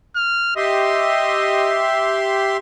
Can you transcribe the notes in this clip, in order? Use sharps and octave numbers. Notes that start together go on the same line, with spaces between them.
F6
G4 D#5 E5 C6